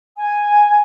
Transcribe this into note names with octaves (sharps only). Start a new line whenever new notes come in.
G#5